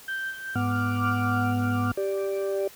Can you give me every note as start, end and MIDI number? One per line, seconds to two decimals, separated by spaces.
0.08 0.55 91
0.55 1.91 44
0.55 1.91 59
0.55 1.91 78
0.55 1.91 86
0.55 1.91 89
1.97 2.67 67
1.97 2.67 74